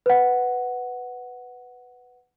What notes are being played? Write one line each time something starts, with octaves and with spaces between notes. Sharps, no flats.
B4 F#5